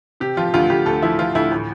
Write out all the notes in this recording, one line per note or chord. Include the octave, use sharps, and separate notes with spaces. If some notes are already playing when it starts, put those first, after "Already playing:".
C3 G4
F3 F4
D2 F4
D2 G4
D2 A4
F3 E4
F3 F4
D2 E4
A2